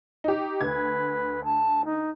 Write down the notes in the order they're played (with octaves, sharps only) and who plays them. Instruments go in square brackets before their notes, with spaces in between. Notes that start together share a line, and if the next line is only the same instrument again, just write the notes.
[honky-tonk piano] D#4 G4
[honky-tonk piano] D2 G#6 [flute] B4
[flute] A5
D#4